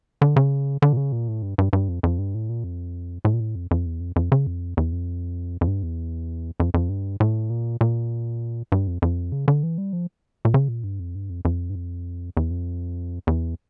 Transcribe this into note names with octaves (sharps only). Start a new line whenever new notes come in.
D3
C#3
D3
A#2
C#3
A#2
A2
G2
G2
G2
F2
F2
G2
A2
A#2
F2
A2
A#2
A2
F2
F2
E2
F2
F2
C#3
F2
E2
F2
F2
G2
E2
F2
F2
G2
A2
A#2
A#2
G2
F2
F2
C#3
D3
E3
G3
F3
A#2
C#3
A#2
G2
F2
G2
F2
F2
G2
F2
E2
F2
E2